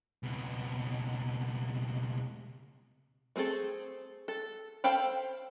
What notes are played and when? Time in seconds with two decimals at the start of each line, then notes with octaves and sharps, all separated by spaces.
0.23 C#2 B2
3.36 A3 C4 G#4 A4
4.28 A4
4.84 A4 C5 F5 G5 B5